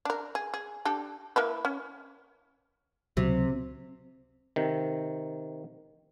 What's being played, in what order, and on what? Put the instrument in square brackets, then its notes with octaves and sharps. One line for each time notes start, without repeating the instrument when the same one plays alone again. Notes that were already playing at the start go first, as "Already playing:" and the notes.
[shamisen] D4 A#4
G#4
G#4
D4 G4 A4
A#3 E4 B4
C#4
[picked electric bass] C#2 F#3 [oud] C3
[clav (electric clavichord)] C3 D#3